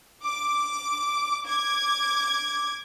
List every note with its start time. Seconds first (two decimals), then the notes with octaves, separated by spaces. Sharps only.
0.24 D6
1.45 D6 G#6